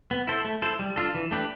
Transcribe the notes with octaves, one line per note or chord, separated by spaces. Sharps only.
B3
E4 A4 C5
A3
E4 A4 C5
G3
D4 F4 A4
E3
A3 D4 G4 B4